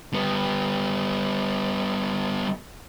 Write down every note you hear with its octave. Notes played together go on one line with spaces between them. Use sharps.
G3 B3